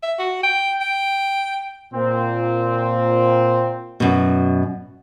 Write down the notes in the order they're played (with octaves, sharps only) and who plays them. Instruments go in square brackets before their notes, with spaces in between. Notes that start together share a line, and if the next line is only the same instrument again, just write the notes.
[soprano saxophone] E5
F#4
G5
G5
[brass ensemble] A#2 C4
[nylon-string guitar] F#2 B2